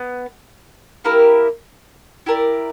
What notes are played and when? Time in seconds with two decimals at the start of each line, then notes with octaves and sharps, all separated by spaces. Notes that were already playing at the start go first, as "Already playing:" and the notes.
Already playing: B3
1.04 A#3 E4 G4 A#4
2.26 E4 G4 A#4 D5